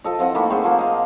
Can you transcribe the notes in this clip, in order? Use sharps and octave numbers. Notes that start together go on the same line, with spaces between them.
F3 A4 D#5
E3 F3 C4 F#5
D#3 A3 A#3 B5
A3 G#4 C5 F#5
F3 A#3
D#5 F5